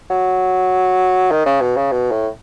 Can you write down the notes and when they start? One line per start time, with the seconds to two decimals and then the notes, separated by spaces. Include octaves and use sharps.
0.10 F#3
1.31 D#3
1.46 C#3
1.61 B2
1.76 C#3
1.92 B2
2.11 A2